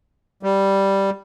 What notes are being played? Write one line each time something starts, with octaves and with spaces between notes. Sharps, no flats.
G3